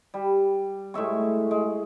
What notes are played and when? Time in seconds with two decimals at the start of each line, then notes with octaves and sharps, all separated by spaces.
0.14 G3
0.94 A2 G#3 E5 C#6
1.51 G#3